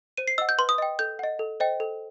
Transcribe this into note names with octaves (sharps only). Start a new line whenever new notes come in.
C5 D#7
C7
D#5 F#5 E6
G6
B4 C6
D#6
D#5 G5
A4 G6
D#5 F#5
A4
C5 D#5 G5
A4